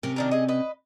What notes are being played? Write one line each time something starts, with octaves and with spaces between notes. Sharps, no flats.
C3 C4 C#4 A#4
D#3 D4 A#4
G#4 D#5
B4 D#5